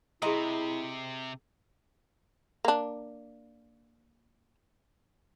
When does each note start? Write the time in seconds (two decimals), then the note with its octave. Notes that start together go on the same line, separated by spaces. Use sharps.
0.22 C3 E4 G#4 D#5 A#5 C6 D#6
2.64 A#3 D4